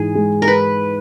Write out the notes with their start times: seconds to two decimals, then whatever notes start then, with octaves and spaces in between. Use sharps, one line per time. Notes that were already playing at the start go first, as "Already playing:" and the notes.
Already playing: G#2 E3 G#3 G#4
0.15 G#3
0.42 A#4
0.48 B4